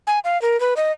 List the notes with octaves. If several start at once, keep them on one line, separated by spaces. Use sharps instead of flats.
G#5
F5
A#4
B4
D#5